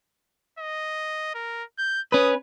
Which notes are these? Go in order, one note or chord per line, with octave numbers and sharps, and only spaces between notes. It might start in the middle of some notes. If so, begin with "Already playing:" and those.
D#5
A#4
G6
C#4 B4 D#6